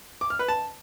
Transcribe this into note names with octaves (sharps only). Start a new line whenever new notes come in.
D6
F6
B4
A5